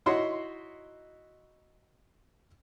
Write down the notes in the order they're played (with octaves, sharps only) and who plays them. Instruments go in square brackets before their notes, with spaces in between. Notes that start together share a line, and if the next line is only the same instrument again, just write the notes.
[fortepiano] D#4 E4 F#4 C#5 F#5 C6